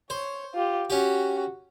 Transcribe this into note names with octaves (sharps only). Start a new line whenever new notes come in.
C5 C#5
F4 G4
C#4 F#4 G4